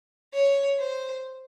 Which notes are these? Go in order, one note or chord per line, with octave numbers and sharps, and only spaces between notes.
C#5
C5